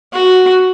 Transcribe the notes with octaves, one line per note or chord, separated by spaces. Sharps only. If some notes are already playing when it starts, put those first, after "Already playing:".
F#4